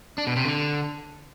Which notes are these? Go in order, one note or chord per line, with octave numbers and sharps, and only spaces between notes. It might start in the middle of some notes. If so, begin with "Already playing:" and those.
D4
B2
C3
D3